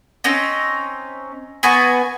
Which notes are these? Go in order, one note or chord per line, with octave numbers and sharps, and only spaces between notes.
C4 C#4 D#4
B3 F#4 G#5 C#6